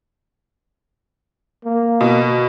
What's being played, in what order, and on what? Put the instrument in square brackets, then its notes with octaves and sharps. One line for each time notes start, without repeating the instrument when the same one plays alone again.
[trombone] A#3
[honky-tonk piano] B2